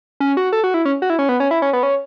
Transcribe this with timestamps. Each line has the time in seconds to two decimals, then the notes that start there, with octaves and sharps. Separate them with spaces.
0.20 C#4
0.37 F#4
0.53 A4
0.64 F#4
0.74 E4
0.85 C#4
1.02 F#4
1.10 E4
1.19 C#4
1.29 B3
1.40 C#4
1.51 E4
1.62 C#4
1.73 B3
1.83 C#4